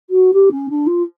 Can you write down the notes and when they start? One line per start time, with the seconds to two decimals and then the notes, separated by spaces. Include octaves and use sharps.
0.10 F#4
0.33 G4
0.51 C#4
0.69 D4
0.87 F4